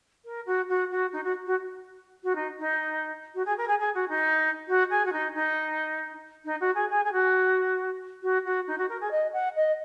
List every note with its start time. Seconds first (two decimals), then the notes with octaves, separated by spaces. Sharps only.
0.24 A#4
0.46 F#4
0.68 F#4
0.90 F#4
1.12 D#4
1.23 F#4
1.46 F#4
2.23 F#4
2.35 D#4
2.58 D#4
3.34 F#4
3.45 G#4
3.57 A#4
3.67 G#4
3.78 G#4
3.94 F#4
4.08 D#4
4.67 F#4
4.90 G#4
5.04 F#4
5.12 D#4
5.34 D#4
6.44 D#4
6.60 F#4
6.74 G#4
6.89 G#4
7.04 G#4
7.11 F#4
8.22 F#4
8.44 F#4
8.67 D#4
8.77 F#4
8.88 A#4
9.00 G#4
9.10 D#5
9.33 F#5
9.55 D#5